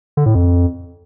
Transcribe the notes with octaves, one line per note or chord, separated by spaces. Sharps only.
D3
A2
F2